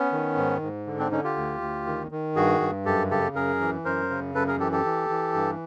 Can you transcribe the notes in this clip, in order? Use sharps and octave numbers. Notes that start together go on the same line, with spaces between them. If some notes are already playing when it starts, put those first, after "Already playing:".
Already playing: B3 C#4
D#3
G#2
G#2
D3
C4 D4
D3 C#4 D#4
F4 G4
D2
D2
D#3
D#3
G2 F#4 G#4
G2
F#2 G4 A4
C#3 G4 A4
F#2 G#4 A#4
E3
F#2 A#4 C5
C#3
F#2 A4 B4
G#4 A#4
E3 G4 A4
G4 A4
E3
E3
G2